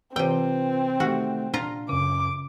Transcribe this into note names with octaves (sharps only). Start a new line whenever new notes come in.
C3 E3 C4 F4 B4 G5
D#3 A3 F#4 G4
A#2 D4 F4 A#5
F#2 C#3 C#4 D6